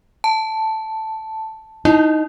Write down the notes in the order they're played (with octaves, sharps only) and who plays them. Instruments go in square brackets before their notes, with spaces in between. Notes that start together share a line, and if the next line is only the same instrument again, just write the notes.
[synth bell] A5
[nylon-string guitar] D#4 [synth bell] E4